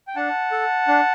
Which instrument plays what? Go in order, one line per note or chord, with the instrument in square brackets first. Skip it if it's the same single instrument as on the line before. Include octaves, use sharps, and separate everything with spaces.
[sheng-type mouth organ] G5
D4 F#5 A5
A4
D4